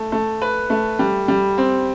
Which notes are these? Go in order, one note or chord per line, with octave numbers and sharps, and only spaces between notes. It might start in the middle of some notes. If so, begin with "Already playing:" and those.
Already playing: A3
A3
B4
A3
G3
G3
C4